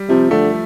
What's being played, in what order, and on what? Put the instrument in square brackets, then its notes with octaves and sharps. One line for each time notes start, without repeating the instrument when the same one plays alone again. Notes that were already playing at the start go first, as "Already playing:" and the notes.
Already playing: [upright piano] G3
[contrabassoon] C3 [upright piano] F3
[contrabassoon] D3 [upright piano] A3